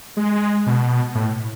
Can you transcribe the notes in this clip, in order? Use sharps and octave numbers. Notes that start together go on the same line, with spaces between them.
G#3
B2
A2